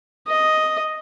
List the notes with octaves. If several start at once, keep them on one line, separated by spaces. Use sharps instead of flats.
D#5